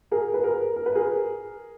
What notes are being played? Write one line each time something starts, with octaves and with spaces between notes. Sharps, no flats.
G#4 A#4
B4
G#4 A#4
A#4
B4
G#4 A#4